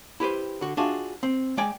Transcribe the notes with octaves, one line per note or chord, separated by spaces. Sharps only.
E4 G4 B4 C5
D3 F#4
D4 F4 F#4 G#4 E5
C4
G#3 D5 G5 G#5